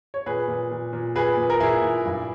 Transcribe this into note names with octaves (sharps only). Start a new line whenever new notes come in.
C#5
A#2 G#4 B4
A#2
A#2
A#2
A#2 G#4 B4
A#2
A#4
A#2 E4 G#4
A#2
G2